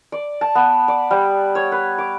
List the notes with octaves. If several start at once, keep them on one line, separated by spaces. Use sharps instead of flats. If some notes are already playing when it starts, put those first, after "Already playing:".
D5
A5
B3
D5
G3
C#5
B4
D6